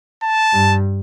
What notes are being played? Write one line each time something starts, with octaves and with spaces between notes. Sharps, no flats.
A5
G2